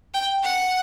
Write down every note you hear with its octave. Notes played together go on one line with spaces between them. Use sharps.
G5
F#5